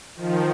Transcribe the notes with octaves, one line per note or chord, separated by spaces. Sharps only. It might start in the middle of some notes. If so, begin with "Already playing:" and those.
D#3 F3